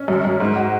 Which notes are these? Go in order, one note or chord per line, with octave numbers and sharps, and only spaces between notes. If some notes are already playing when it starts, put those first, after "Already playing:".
Already playing: C#4
F#2
F#2
G#2
F#4